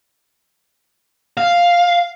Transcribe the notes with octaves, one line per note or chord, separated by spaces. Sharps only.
F5